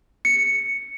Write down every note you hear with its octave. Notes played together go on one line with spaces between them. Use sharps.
C#7